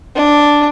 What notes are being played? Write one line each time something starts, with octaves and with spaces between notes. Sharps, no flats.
D4